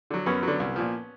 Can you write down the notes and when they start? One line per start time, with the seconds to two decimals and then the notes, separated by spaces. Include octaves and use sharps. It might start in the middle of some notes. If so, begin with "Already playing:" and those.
0.10 D3 F#3
0.26 F#2 B3 C#4
0.43 D3 F#3
0.60 C2
0.76 A#2 F3